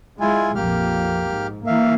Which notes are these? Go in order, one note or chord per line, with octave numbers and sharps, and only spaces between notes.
G#3 E4 F4 G#5
A#1 F2 A#3 G4 F6
G#2
E3 A#3 E5 F5